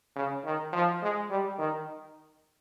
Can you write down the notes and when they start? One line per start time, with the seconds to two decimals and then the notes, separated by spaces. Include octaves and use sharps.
0.16 C#3
0.45 D#3
0.73 F3
1.02 G#3
1.30 G3
1.58 D#3